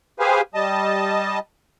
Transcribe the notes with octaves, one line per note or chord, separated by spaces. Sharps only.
G4 G#4 B4 C5 F5 G#5
G3 D#5 A5